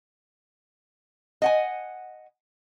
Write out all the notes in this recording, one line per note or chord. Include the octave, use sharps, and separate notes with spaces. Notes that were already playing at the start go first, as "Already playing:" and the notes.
D#5 F#5 G#5